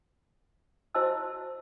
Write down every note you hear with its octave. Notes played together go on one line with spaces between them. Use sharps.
E4 F#4 C5 D#5 A5 E6